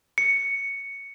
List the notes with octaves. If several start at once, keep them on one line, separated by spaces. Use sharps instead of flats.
C#7